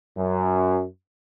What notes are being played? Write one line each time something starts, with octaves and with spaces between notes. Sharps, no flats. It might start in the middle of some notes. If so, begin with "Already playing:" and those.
F#2